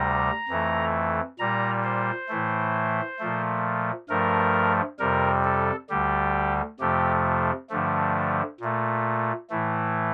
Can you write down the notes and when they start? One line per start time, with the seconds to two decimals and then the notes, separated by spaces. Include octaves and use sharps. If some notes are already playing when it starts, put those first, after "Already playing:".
Already playing: D2 C3 G3 A#5
0.49 F2 E3 A3
1.39 A#2 G3 A#5
1.84 C5
2.29 A2 E3 A3
3.19 A#2 F3 A3
4.09 G2 F3 A3 A#4
4.99 F2 C3 G3 A#4
5.44 A4
5.89 D2 D3 G3 G4
6.80 F2 C3 F3 A3 G4
7.70 G2 D3 F3 A3
8.60 A#2 A3
9.50 A2 E3 A3